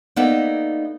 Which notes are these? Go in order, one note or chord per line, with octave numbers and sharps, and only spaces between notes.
A#3 B3 D#4 A4 D5 E5